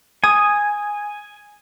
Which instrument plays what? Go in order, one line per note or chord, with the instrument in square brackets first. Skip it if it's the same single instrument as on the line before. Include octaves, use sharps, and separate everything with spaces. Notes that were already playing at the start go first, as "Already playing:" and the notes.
[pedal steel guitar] G#5 [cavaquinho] D#6